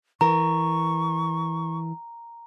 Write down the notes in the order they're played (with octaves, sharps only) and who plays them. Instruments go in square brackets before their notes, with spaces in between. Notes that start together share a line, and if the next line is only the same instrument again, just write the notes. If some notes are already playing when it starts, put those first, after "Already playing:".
[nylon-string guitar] E3 A#4 [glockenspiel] A#5 [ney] C#6